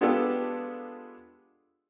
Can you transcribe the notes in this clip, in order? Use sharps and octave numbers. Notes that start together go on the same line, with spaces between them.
G#3 B3 D4 F4 G4 A4